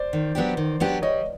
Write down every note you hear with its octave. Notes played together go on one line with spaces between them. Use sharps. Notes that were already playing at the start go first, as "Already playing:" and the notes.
Already playing: C5 D5
D#3
F#3 B3 D4 G4
D#3
F#3 B3 D4 G4
G3 C#5 D#5